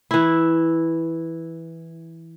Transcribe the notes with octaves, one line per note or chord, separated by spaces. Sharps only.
E3 E4